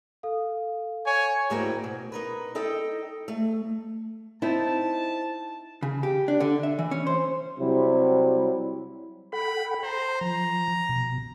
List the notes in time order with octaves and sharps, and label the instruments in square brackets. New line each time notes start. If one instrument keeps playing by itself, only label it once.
[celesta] A4 F5
[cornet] C#5 [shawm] G#5
[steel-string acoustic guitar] D2 G#2 A#3 E4 F#4 G5
B2
D#4 A#4 B4
D#4 A4 D#5 G5
A3
[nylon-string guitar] C4 D#4 E4 [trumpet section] A5
[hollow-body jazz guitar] C#3
G4
D4
D3
E5
E3
C#4
C5
[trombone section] C3 F#3 G3 E4
[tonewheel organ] A4 F#5 G5 [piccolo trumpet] B5
[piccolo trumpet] C5 [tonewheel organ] A#5
[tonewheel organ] F3 [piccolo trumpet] A#5
[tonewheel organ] B2